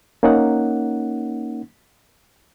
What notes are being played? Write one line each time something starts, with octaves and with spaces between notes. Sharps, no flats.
A#3 C#4 D#4 F#5